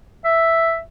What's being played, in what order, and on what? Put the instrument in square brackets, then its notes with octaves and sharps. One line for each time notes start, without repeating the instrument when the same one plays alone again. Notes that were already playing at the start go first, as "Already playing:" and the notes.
[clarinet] E5